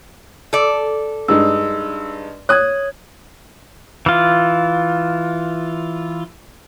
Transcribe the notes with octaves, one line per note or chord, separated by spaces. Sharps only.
A4 D5
G2 G#3 D#4 E6
C#5 D#6 F#6 G#6
E3 F4